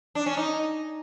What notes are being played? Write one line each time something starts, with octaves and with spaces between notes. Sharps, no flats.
D4
C#4
D#4